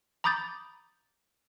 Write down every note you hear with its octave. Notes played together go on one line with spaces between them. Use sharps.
A#5 B5 D6 D#6 G6 A6